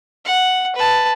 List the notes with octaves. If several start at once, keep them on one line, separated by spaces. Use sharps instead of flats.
F#5
B4 A5